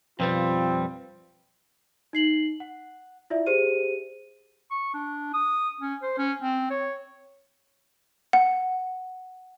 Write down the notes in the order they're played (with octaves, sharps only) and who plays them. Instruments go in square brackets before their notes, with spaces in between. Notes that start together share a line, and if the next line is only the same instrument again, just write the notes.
[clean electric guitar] F2 F3 G3 [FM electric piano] B2 B4 [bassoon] C4 [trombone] F4
[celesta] D#4 C7 F#7
F#5
E4 F4 D5 E5
G4 G#4 C5 D#7
[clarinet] C#6
D4
D#6
C#4
C5
C#4
C4
C#5
[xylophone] F#5